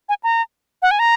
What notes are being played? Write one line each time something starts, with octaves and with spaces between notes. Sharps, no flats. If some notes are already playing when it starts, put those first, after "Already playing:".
G#5
A#5
F#5
G#5
A#5